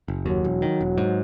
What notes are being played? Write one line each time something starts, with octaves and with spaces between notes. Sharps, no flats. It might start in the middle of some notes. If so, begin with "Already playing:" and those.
F#1
D#2 F#3
E1
D#3
E1
G#2